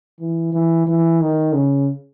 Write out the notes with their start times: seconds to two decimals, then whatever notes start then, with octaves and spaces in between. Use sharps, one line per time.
0.20 E3
0.53 E3
0.87 E3
1.21 D#3
1.53 C#3